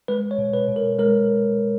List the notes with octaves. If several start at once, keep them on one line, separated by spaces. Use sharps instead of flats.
G#3 B4
C#5
B2
B4
B2
A#4
G#3 A#4